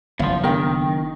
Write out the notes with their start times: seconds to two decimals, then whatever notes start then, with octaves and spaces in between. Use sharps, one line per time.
0.19 F#1 E2 F3 F5
0.44 D#3 B3 D4 A#4 G5